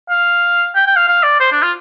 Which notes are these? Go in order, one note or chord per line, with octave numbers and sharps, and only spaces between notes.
F5
G5
G5
F5
F5
D5
C5
D4
F4